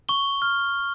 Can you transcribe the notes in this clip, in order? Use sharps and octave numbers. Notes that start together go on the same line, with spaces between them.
C#6 G7
F6